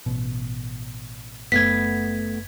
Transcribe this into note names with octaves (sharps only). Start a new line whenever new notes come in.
A1 B2
F#1 A3 B3 G#6 B6